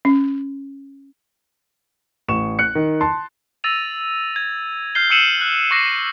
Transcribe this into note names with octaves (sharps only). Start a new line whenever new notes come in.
C#4
A1 C#6 E7
F#6 C#7
D#3
A5 C6
E6 A6 A#6 D#7 F7
G#6
F6 G6 G#6 C7 G7
E6 C7 C#7 D#7 E7 F#7
F#6
C#6 D6 F#6 A#6 C7 D#7